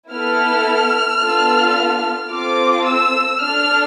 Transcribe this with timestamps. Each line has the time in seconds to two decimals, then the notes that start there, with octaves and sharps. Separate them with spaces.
0.12 B3 E4 A4 F6
1.22 B3 D4 F4 A4
2.32 C4 F4 A4 D6
2.87 E6
3.41 D4 A4 F6